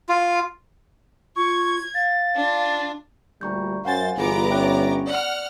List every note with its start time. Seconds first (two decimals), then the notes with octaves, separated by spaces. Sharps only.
0.09 F4
1.36 F4 C#6 G#6
1.95 F5 A6
2.35 D4 F4
3.41 D2 A#2 G3 A#5 C#6 G6
3.85 F#2 C5 F5 F#5 G#5 A6
4.17 G1 E3 B3 F4 G#4 A#5 D6
4.50 C#4 C#5 E5 G5 F#6
5.07 D5 F#5 F6